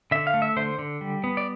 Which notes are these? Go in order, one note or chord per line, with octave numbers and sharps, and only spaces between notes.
D3 E5
F5
A3
E5
D3 C5
D3
G3
B3
D5